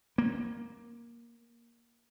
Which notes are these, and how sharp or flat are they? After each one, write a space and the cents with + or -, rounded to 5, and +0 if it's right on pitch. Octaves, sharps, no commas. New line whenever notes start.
A#3 +10